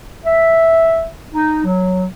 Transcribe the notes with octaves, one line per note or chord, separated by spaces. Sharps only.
E5
D#4
F#3